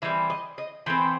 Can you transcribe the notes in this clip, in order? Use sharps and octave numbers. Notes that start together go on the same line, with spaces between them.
E3 G3 C4 E5
D#5
D#5
E3 A3 C4 C5